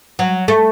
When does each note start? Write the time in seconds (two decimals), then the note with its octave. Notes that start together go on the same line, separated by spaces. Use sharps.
0.19 F#3
0.48 A3